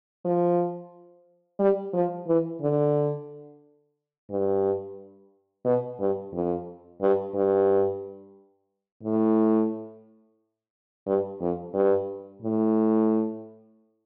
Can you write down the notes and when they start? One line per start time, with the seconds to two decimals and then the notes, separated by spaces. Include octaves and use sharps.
0.25 F3
1.59 G3
1.94 F3
2.27 E3
2.61 D3
4.30 G2
5.65 B2
6.00 G2
6.33 F2
7.01 G2
7.35 G2
9.03 A2
11.06 G2
11.41 F2
11.74 G2
12.42 A2